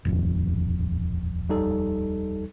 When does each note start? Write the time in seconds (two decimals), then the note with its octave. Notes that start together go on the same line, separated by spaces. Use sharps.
0.05 D#1 A1 F2
1.49 G3 D#4 A4